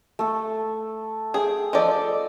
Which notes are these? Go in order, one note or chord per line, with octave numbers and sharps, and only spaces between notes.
A3 A4
G#4 G5
F3 A4 D5 D#5